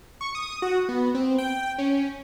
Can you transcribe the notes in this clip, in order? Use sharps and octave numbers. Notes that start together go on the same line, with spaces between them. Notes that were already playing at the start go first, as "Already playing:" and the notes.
C#6
D#6
F#4
B3
C4
G5
C#4